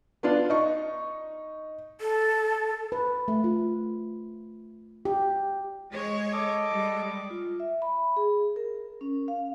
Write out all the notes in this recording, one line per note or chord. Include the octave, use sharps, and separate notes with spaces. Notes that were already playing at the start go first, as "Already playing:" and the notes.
B3 D4 F4 D5
D#4 C#6
A4
B4
A3
F4
G4
G#3 C#5
A4 D#5 D6
G3 G#3
F4
E5
B5
G#4
A#4
C#4
F5